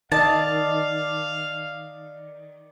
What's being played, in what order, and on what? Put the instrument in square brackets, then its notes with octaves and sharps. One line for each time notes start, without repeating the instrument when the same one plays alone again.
[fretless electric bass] D#3 [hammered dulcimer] D5 D#5 [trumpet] F5 [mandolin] A5